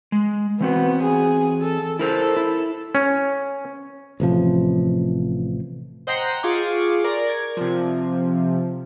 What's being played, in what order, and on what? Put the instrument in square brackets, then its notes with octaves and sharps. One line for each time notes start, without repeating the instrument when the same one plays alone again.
[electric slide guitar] G#3
[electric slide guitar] E3 C4 F#4 [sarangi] B3
[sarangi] G#4
A4
[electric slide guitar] E4 A#4 C5 [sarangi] A4
[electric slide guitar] E4
[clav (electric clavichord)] C#4
[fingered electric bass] A1 C3 F3
[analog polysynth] C5 D#5 F#5 G5 A#5 C6
F4 G#4 C#6 D6
A#4 D5
G#6
C3 F3